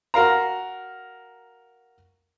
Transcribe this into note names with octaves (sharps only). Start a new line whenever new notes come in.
F#4 A#4 F5 A#5